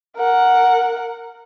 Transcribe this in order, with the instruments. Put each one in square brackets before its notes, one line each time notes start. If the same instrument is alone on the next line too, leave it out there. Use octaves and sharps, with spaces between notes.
[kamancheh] A#4 F#5